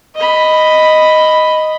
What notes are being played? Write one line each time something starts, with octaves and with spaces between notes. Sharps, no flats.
D#5 B5